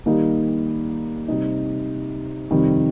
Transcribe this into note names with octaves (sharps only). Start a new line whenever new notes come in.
D#3 G3 A#3 D#4
C3 G3 D#4
F2 C3 D#3 G3